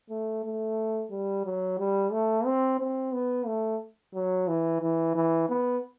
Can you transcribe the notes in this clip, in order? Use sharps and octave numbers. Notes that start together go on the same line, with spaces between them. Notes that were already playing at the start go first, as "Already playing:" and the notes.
A3
A3
G3
F#3
G3
A3
C4
C4
B3
A3
F#3
E3
E3
E3
B3